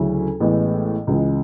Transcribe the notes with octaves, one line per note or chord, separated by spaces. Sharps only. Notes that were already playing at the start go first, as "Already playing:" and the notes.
Already playing: D2 C#3 F#3 C#4 E4
A1 A2 G#3 B3
C#2 C#3 E3 G#3